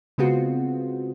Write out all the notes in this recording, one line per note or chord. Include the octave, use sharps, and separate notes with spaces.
C#3 G#3 B3 C4 F4 F#4